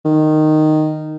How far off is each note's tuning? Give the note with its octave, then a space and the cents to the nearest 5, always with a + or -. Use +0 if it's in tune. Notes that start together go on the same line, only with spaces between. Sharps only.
D#3 -10